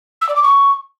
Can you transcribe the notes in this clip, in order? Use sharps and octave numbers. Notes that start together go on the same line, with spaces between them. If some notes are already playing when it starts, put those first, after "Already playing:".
E6
D5
D6
C#6